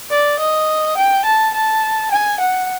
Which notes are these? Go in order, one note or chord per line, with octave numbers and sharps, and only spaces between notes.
D5
D#5
G5
A5
A5
G#5
F#5